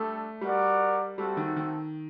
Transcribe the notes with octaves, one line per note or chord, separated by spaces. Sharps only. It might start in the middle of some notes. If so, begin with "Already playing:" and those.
Already playing: G3 A3 D4 A4
G3 F#4 A#4 D5 F#5
G3 A3 C4 F#4 A4
D#3
D#3